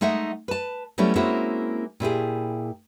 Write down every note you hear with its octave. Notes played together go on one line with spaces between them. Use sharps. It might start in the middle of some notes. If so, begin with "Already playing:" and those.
G#3 A3 D#4 E5 F#5
B4 A5
F#3 G3 A3 B3 C#4 E4
G#3 A#3 C4 C#4 E4 F#4
A#2 E4 G4 G#4